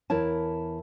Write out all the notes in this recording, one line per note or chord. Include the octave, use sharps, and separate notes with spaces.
E2 E4 A#4 C#5 A5